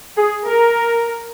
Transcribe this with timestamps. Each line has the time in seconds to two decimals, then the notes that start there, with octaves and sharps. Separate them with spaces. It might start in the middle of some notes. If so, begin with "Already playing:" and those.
0.17 G#4
0.46 A#4